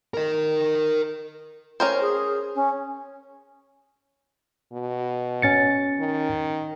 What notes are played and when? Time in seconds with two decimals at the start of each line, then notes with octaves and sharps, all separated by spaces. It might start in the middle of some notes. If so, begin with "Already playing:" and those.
0.14 A#4 D#5
1.80 C#4 A#4 C5
2.01 G#4
2.55 C#4
4.73 B2
5.42 C#4 A6 C#7
6.00 D#3